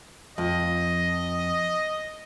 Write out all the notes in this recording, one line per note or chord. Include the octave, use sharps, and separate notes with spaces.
F2 D#5